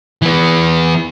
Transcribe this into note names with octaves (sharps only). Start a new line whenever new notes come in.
E3 B3